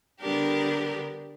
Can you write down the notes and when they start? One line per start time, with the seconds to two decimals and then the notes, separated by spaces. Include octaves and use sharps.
0.19 D3 G3 B3 D4 G4 A#4